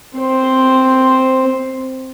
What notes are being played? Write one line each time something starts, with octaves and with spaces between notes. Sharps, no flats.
C4 C5